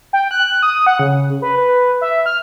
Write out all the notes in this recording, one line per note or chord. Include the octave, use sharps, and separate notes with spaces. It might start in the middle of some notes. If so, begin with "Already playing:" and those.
G5
F#6
D#6
F#5
C#3
B4
B4
E5
F6